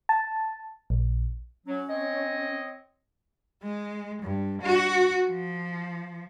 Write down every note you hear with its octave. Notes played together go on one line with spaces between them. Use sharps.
A5
A#1
F#3 C#4
C4 C#5 D#5
G#3
G2
F#4
F3